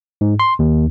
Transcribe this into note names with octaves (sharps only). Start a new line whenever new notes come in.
G#2
C6
D#2